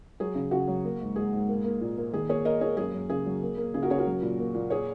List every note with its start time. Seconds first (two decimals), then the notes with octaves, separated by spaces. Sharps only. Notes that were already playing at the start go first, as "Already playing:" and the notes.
0.20 F#3 G#4
0.35 C#3
0.51 C#3 F#4
0.68 F#3
0.85 A#3
1.01 G#2
1.16 G#2 G#4
1.33 G#2
1.48 A#3
1.64 A#3
1.81 A#2
1.97 A#3
2.13 D#3 G#4
2.29 A#3 G#4 C#5
2.45 A#3 A#4 D#5
2.61 A#3 G#4 C#5
2.77 F#2 G#4
2.94 F#2
3.10 C#3 G#4
3.26 F#3
3.42 A#3
3.57 A#3
3.74 C#3 G#4
3.82 F#4 A#4
3.90 C#3 G#4 C#5
3.98 F#4 A#4
4.06 F#3
4.22 A#2
4.39 A#3
4.54 A#2
4.70 G#4 C#5